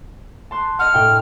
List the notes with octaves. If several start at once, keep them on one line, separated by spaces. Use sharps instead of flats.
A5 C6 F#6
D#5 F#5 F6
A2 G5